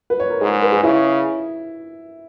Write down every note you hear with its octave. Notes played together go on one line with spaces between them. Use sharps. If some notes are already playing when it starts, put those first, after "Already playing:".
B4
C#5
A#4
G#2 G#4
B4
G#4
C#3 E4